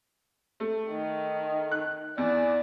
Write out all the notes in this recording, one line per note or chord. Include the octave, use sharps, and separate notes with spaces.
A3
D#3
F#6
E2 D5